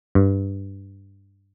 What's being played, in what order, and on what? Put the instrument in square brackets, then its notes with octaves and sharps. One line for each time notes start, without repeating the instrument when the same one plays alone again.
[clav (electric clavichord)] G2